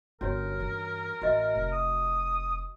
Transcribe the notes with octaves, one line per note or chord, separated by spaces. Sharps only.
G1 D3 C#4 F#4 A#4 C#5
G2 E3
A1 F#4 D#5 E5
F1
D#6